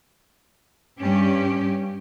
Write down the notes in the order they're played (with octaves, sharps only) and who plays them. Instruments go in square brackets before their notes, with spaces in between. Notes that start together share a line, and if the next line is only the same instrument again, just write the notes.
[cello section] G2 C#4 G4